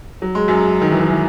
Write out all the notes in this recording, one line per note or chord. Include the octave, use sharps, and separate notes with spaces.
F#3
G#3
F#2 F#3
D#3
E3
D#3
E3